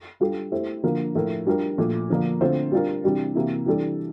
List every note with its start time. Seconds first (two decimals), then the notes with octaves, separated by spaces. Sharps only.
0.20 G3 D4 F4 A4
0.52 A3 E4 G4 C5
0.83 D3 F3 A#3 F4 A#4
1.15 A2 F3 A3 E4 A#4
1.47 G3 D4 F4 A#4
1.78 A#2 F3 A3
2.10 D3 F3 A#3 D4
2.41 D3 A3 C4 F4 C5
2.72 G3 D4 F4 A#4
3.04 C3 E3 G3 D4
3.35 C3 E3 A#3 E4
3.66 E3 G3 D4 A4